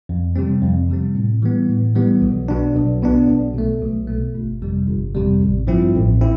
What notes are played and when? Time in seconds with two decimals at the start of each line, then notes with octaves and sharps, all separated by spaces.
0.09 F2
0.36 C3 G3 C4
0.62 F2
0.89 C3 G3 C4
1.15 A2
1.42 E3 G3 B3
1.69 A2
1.95 E3 G3 B3
2.22 B1
2.48 B2 B3 D4
2.76 B1
3.02 B2 B3 D4
3.29 B1
3.55 B2 A3
3.82 B1
4.08 B2 A3
4.35 G1
4.62 F2 C3 G3
4.88 G1
5.15 F2 C3 G3
5.41 A1
5.67 G2 F3 C4 E4
5.94 A1
6.21 C4 E4